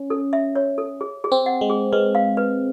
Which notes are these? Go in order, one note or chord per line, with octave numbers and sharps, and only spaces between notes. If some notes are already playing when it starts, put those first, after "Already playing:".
Already playing: C#4
A4
E5
C#5
A4
G#4
G#4
C4
F#5
G#3
G#4
G#3 B4
F5
B4